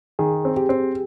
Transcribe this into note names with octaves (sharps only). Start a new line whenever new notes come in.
D#3 G#4
C4
G4
C4